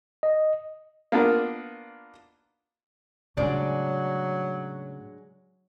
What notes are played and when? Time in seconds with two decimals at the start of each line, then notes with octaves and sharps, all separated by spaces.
0.23 D#5
1.12 A#3 B3 D4 F4
3.37 A2 C#3 F#3 G#3 D4 D5